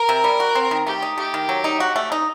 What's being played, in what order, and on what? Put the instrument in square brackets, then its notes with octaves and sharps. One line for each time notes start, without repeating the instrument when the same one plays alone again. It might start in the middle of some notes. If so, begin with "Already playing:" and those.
Already playing: [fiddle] A#4
[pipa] C3
G3
F#4
C4
D#3
[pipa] A3 [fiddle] G4
[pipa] D#4
[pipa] A3 [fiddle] G4
[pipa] D#3
F#3
D#4
F#4
A3
D#4